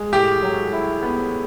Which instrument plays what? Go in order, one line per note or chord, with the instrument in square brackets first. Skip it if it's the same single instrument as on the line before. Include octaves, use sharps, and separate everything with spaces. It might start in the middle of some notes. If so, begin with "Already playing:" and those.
Already playing: [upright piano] G#3
[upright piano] A2 [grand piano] G4
[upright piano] F#3
E4
B3